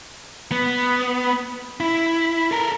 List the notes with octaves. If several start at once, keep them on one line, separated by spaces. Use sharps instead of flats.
B3
E4
A4 A#4